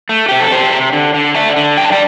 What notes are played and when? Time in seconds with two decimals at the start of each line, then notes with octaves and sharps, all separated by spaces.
0.09 A3
0.29 C3 G4
0.40 A4
0.51 E2 G4 C5
0.72 C3
0.93 D3
1.14 D3
1.35 D3 E5 A5
1.56 D3
1.77 G2 G5
1.85 A5
1.92 D5 G5